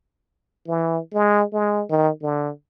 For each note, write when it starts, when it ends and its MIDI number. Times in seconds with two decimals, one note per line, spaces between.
0.67 0.99 52
1.14 1.43 56
1.53 1.83 56
1.90 2.09 51
2.22 2.50 50